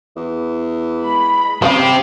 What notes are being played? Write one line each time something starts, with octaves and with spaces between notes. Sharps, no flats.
E2
G#3 B5
C4 C#4 G4 D#5 F5